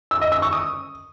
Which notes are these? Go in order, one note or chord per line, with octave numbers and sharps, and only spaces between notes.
E6
D#5
E6
C#6
D#6